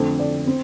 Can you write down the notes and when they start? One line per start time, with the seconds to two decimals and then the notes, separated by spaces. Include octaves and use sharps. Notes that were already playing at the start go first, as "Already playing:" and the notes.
Already playing: F2 D3 A3 C4
0.19 D5
0.47 C4